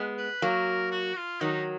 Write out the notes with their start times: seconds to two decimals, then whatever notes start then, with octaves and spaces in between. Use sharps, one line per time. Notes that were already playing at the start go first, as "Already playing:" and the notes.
Already playing: G#3 B3
0.18 B4
0.42 F#3 A#3 A#4
0.92 F#4
1.17 F4
1.41 D#3 F#3 D#4